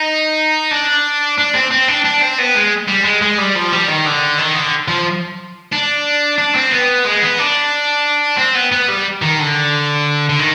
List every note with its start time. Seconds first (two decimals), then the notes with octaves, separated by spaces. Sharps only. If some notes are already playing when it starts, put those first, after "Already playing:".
Already playing: D#4
0.71 D4
1.38 D4
1.55 C4
1.71 C4
1.88 D4
2.04 D4
2.21 C4
2.38 B3
2.55 G#3
2.88 G3
3.04 G#3
3.22 G#3
3.38 G3
3.55 F3
3.72 G3
3.88 D#3
4.06 D3
4.38 D#3
4.56 D3
4.88 F3
5.72 D4
6.38 D4
6.55 C4
6.71 B3
7.06 G#3
7.22 B3
7.39 D4
8.38 C4
8.56 B3
8.72 B3
8.89 G3
9.22 D#3
9.40 D3
10.30 D3
10.39 D#3